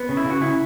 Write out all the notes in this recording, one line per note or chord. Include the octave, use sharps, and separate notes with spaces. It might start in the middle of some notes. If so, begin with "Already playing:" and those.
Already playing: B3
C#3
E4
C#3 F#4
C#3 E4